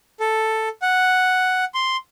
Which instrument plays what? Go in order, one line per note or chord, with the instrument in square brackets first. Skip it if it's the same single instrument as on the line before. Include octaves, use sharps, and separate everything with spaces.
[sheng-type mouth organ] A4
F#5
C6